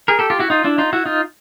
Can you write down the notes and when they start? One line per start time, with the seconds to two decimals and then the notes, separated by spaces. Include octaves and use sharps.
0.08 G#4 A#4
0.19 G4 A4
0.30 F4 G4
0.39 E4 F#4
0.50 D#4 F4
0.64 D4 E4
0.78 D#4 F4
0.93 E4 F#4
1.06 D#4 F4